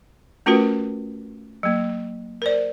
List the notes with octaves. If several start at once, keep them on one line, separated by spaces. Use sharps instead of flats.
A3 C#4 F4 F#4 A#4 B4
F#3 A#3
A#4 C5 D5